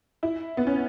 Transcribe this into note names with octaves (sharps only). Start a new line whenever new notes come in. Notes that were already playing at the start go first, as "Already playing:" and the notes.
E4
B3
C#4